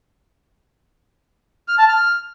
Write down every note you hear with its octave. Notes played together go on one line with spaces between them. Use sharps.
F6
A5
F6